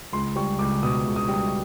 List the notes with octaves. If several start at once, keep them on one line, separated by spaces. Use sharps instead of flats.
C#2 C6
G3 C#6
C#2 D6
B2 D#6
C#2
D#6
G3
D#6